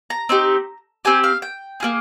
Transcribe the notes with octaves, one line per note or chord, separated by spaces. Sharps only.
A#5
C4 D#4 G4
C4 G4 G#5
F5
G5
A#3 F4 G#4